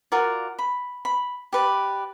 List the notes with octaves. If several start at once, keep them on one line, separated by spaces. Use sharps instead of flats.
F4 F#4 A#4 D5
B5
B5
G4 B4 D5